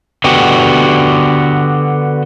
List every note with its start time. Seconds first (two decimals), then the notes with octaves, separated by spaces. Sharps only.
0.24 D3 B3 F#4 G4